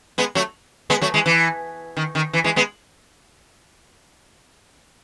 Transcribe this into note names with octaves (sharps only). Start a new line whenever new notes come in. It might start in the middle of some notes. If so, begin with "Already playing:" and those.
G#3 B3
F#3 A3
G#3 B3
F#3 A3
E3 G#3
E3
D#3
D#3
E3
E3 G#3
G#3 B3